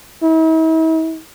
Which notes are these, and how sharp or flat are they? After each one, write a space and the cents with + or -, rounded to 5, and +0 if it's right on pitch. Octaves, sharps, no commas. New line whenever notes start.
E4 -45